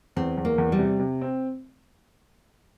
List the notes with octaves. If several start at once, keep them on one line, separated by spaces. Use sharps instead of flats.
E2 C4
E2
A#3
E2
G3
C3
C3
C4